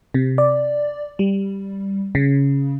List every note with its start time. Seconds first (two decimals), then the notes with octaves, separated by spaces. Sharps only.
0.14 C3
0.38 D5
1.19 G3
2.15 C#3